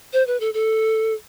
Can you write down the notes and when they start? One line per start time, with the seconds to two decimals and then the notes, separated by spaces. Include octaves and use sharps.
0.13 C5
0.27 B4
0.40 A4
0.54 A4